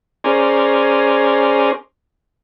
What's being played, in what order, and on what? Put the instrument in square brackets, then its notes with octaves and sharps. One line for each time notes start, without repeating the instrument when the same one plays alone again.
[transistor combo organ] C#4 G#4 A#4 C5 D5